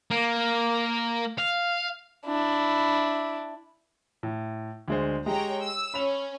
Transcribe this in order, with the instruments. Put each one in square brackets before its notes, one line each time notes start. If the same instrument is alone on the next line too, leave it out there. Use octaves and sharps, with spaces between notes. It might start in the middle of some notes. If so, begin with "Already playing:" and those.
[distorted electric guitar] A#3
F5
[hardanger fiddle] D4 E4
[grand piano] A2
D2 G#3 C5
[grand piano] G#3 G4 [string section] C#5 G5 A#5
[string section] E6
[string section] C#4 [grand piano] B5 F7